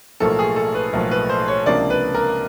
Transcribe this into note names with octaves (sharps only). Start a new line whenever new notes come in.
B1 A2 F3 A#3 A4
G#4
A4
B4
B1 A2 F3 A#3
B4
C5
C#5
C#2 C3 F3 A#3 D4 D5
B4
A#4